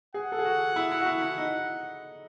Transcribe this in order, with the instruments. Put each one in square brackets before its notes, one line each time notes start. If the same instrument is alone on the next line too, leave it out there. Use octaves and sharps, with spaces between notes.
[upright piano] G#4 [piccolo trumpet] F#5
[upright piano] A4
G#4
F#4
E4
E4
F#4
E4
E4
D#4